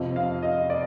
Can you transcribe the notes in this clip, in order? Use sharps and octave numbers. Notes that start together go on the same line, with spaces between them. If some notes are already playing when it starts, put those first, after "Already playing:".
Already playing: F2 C3 F3 D#5
F5
D#5
D5